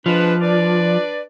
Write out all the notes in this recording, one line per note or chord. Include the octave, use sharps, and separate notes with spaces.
F3 G#3 D4 B4
D4 B4 D5